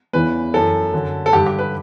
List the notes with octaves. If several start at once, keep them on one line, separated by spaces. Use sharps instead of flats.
E2 C#3 E3 B4
F#2 E3 A4
F#2 D3
A4
G2 D3 G4
G4
B4